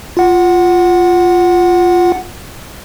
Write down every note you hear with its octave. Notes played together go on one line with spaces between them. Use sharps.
F4 F#5